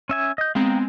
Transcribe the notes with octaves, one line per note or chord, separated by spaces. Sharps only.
C#4 E5 G#5
D#5 G6
G#3 B3 C4 F5 G5 A#5